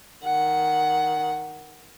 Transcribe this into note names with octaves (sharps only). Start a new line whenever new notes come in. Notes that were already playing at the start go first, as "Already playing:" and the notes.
D#3 F#5